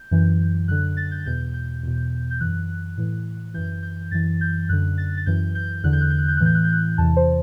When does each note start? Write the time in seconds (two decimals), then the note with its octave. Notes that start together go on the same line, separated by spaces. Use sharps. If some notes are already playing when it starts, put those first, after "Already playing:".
Already playing: G6
0.11 F#2 E3
0.68 F#2 D3 F#6
0.97 A6
1.11 G6
1.26 E2 B2 G6
1.54 G6
1.83 E2 B2
2.30 G6
2.40 F#2 E3 F#6
2.98 A2 E3
3.54 F#2 E3 G6
3.83 G6
4.11 F#2 E3 A6
4.41 G6
4.69 F#2 D3 F#6
4.98 A6
5.17 A6
5.26 F#2 E3 G6
5.55 G6
5.83 E2 D3 F#6
5.93 G6
6.01 F#6
6.10 G6
6.19 F#6
6.28 G6
6.37 A2 E3 F#6
6.46 G6
6.55 F#6
6.64 G6
6.73 F#6
6.98 E2 C3 E3 A5
7.16 C5